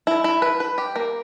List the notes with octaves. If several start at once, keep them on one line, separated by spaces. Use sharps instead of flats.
E4
E4
B4
B4
G4
A#3